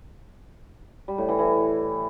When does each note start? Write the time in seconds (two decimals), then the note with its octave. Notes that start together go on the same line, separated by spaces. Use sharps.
1.08 G3
1.18 A2
1.28 E3
1.39 E3